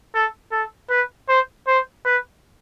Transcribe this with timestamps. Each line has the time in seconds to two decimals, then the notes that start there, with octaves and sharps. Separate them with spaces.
0.14 A4
0.52 A4
0.90 B4
1.29 C5
1.67 C5
2.05 B4